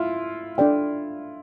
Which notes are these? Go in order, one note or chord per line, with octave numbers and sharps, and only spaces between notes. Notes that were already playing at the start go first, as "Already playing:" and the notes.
Already playing: E4 F4
D4 A4 D5 G5